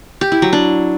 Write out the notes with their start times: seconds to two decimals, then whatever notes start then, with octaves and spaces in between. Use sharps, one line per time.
0.21 G4
0.32 E4
0.42 F#3
0.53 D4